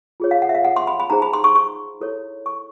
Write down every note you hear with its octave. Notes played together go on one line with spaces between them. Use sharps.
F4 G#4 C#5
F5
F#5
E5
F5
F#5
C6
B5
B5
D#4 G#4 C5 A#5
B5
C6
C#6
C#6
E4 A4 C#5
C#6